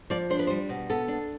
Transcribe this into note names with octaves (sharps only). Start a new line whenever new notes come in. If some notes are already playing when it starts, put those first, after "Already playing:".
F3 D5
D4 C5
B4
C5
G3
B2
B3 A4
D4